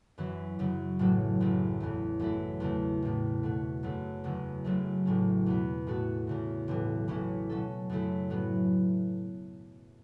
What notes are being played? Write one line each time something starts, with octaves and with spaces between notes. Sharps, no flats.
F#2 E3 C#4 E4
F#2 C#3 F#3
A1 A2 F#3
F#1 F#2 C#3 E3
E2 C#3 E3 A3
F#2 E3 A3 E4 A4
E1 E2 C#3 A3
A1 A2 A3
B2 A3 F#4
F#1 F#2 F#3 A3 F#4
F#1 E2 C#3 F#3
F#1 F#2 F#3 A3
A1 A2 A3 C#4
E2 B2 B3
A2 A3 F#4 A4
E2 C#3 E3
B1 A2 E3
A1 A2 E3 C#4 E4
B2 F#3 C#4 A4
F#2 C#3 A3 E4
A2 F#3 B3